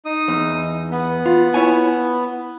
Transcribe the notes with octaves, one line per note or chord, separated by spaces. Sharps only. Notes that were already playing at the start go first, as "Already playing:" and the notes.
D#4 D#6
E2
B3
F4
E4 C#5 G#5